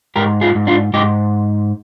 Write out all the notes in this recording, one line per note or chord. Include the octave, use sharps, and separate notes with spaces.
G#2 G4 A#4
F4 G#4
G#2
D4 F4
G#2 D#4 G4